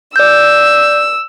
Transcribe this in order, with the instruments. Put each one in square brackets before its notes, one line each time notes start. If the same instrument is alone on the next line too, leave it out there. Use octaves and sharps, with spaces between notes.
[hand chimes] D5 G6 [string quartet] E6